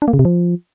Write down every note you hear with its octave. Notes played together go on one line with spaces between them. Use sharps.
D4
A#3
C#3
C3
F3